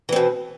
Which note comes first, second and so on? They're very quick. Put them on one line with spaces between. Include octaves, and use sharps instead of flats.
E3 C4 B2